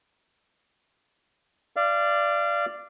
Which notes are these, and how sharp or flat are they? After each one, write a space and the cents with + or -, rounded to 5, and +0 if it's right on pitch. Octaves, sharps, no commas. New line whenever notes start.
D5 +5 F5 -30